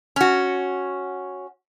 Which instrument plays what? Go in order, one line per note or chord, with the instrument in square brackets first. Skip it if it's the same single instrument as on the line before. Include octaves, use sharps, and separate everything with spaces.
[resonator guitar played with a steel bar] C#4 F#4